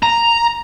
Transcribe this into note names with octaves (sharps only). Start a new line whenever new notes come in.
A#5